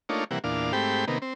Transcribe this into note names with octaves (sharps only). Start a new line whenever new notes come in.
A3 A#3 D4 D#4 F4 C#5
C3 E3 G3 A#3 F#5
E2 A#2 D4 F5
G#2 A3 C4 G4 G5 B5
C3 D#3 A#3 B3
C4